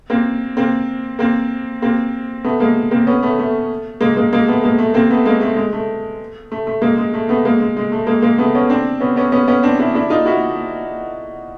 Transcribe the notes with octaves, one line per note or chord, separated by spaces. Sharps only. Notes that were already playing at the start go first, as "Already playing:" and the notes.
A#3 C4
A#3 C4
A#3 C4
A#3 C4
A3 B3
G#3 A#3
A#3 C4
B3 C#4
A3 B3
A3
G#3 A#3
G#3 A#3
G#3 A#3
A3 B3
G#3 A#3
A3
A#3 C4
A3 B3
G#3 A#3
A3
G#3
A3
A3
A3
G#3 A#3
G#3
A3
A3 B3
G#3 A#3
G#3
G#3
A3
G#3 A#3
G#3 A#3
A3 B3
B3 C#4
C4 D4
B3 C#4
B3 C#4
B3 C#4
B3 C#4
C4 D4
D4 E4
D4 E4
D#4 F4
E4 F#4